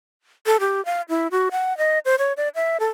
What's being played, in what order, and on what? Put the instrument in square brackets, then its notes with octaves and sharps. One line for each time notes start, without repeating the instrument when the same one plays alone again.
[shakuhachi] A4
G4
F5
E4
F#4
F#5
D#5
C5
C#5
D5
E5
A4